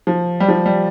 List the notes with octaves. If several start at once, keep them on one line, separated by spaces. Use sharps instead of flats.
F3
G3
F3
G3